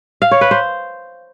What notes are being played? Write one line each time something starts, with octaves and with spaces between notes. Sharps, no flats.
F5
C#5
B4
C5